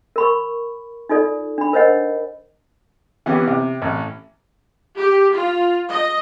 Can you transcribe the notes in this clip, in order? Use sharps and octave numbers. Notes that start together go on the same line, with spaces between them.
A#4 B5 C#6
D#4 F4 A4 D5
D4 B5
A#4 C5 C#5 D#5 F#5
E3 B3 C#4 G4
C3
A1
G4
F4
D#5